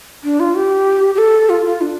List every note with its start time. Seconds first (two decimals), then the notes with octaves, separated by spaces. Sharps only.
0.24 D4
0.40 F4
0.55 G4
1.15 G4
1.18 A4
1.49 F4
1.65 F4
1.81 D4